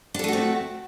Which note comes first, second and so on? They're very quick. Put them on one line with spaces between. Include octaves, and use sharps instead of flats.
D4 A4 A3 F#4 C4